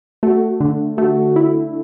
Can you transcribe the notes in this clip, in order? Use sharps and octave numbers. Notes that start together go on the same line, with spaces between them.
A3 F#4
D3
A3 F#4
E4